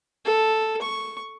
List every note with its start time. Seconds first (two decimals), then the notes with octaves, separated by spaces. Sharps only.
0.25 A4
0.82 C#6